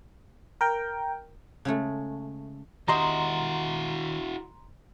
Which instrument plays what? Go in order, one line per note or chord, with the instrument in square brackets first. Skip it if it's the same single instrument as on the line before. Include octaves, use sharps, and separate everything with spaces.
[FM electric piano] A#4 G5
[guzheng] C#3 G#3 A3
[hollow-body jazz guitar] D#3 G4 D#5 [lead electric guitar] E4 F#4 [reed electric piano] A#5 C6